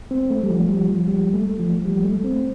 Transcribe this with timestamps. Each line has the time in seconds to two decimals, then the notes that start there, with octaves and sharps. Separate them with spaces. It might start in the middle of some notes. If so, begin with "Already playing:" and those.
0.11 C4
0.30 A3
0.43 G3
0.50 F3
0.69 G3
0.89 F3
1.08 G3
1.34 A3
1.59 F3
1.85 G3
2.04 A3
2.24 C4